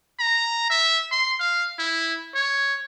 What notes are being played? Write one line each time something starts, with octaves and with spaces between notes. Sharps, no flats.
A#5
E5
C6
F5
E4
C#5